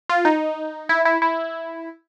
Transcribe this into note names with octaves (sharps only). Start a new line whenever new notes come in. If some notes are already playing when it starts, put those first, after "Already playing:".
F4
D#4
E4
E4
E4